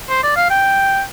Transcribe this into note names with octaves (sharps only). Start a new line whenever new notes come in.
C5
D5
F5
G5